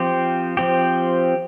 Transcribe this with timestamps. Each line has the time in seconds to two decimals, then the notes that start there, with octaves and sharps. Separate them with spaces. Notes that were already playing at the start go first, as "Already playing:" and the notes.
Already playing: F3 C4 G4
0.57 F3 C4 G4